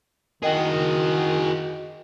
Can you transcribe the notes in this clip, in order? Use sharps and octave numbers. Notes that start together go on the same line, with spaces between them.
D#3 F#4 G#4 A#4 D#5 G5